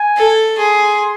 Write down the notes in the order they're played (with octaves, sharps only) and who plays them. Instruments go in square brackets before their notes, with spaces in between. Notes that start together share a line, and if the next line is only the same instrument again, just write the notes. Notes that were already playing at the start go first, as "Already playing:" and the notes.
Already playing: [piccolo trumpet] G#5
[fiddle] A4
[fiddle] G#4 [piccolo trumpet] C6